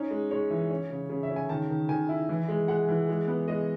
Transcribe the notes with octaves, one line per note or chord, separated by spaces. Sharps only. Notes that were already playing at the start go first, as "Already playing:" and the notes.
Already playing: C#4 D#4
G#3
G#3 C#5
E3
C#4
C#3
C#3
E5
C#4
G#5
D#3 A5
D#3
D#3 G#5
E4
E3
G#3
G#3 F#5
E3
G#3
B3
G#3 D#5